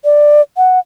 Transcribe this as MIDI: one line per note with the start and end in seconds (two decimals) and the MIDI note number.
0.04 0.41 74
0.57 0.79 78